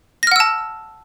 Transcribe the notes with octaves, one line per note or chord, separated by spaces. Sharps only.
F#5 A5 E6 F6 A#6